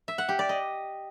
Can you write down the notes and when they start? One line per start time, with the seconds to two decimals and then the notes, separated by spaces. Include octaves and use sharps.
0.08 E5
0.18 F#5
0.29 G4
0.39 D5
0.49 D#5